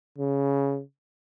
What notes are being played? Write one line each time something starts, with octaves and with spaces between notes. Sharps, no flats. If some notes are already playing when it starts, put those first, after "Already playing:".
C#3